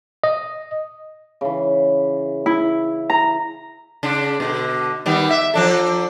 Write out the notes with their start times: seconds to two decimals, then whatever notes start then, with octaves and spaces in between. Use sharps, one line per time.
0.24 D#5
1.41 C#3 E3
2.46 E4
3.10 A#5
4.03 C#3 D4
4.40 B2 D3
5.06 D#3 G3 B3
5.30 E5
5.54 F3 D4 A4